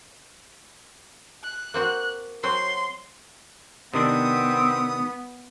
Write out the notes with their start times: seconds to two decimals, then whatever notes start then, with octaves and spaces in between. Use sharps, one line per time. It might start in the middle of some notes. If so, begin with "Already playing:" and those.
1.43 F#6
1.74 A#3 C4 F#4
2.43 F#3 C4 F#4 C6
3.94 C3 D#3 B3 C4 D4 D#6